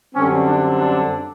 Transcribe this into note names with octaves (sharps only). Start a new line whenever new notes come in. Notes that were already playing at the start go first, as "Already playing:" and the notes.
F#2 D3 G3 C4 C#4
D4
D4